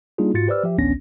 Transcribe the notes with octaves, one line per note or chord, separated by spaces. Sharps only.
G3 A#3 D4 D#4 F4 G#4
G#2 F4 F#4 A6 C#7
G4 B4 C5 D5 E6 F6
F3 G4 E5
A1 D2 B3 C#4 D4 A#6